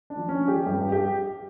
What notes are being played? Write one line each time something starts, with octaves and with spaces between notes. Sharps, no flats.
D4
F3
C#4
F3
G4
G2 G4
G4